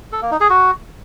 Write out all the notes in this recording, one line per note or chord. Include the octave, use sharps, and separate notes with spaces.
A4
A#3
D#4
G#4
F#4